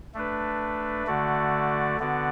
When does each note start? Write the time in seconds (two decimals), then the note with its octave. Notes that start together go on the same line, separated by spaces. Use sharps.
0.14 A3 D4 B4
1.07 D3 A3 F#4 D5
1.99 D3 B3 F#4 D5